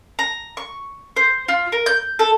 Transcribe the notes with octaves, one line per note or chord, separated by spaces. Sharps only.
A#5
C#6
C5
F4
A#4
G6
A4